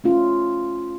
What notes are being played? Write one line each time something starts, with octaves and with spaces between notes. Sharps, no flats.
A3 C#4 F4